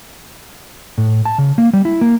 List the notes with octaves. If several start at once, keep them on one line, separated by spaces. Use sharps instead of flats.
A2
A5
C#3
A#3
G3
E4
A#3